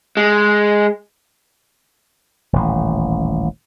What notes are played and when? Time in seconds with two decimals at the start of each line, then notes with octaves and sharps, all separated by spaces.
0.17 G#3
2.53 D#1 A1